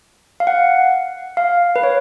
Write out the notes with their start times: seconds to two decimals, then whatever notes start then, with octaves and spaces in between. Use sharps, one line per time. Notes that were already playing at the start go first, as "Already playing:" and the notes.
0.40 F5
0.47 F#5
1.37 F5
1.76 B4
1.83 C#5